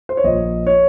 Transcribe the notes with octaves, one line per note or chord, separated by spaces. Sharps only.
C5
C#5
A#1 D#5
C#5